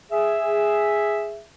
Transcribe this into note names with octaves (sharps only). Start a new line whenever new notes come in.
G#4 E5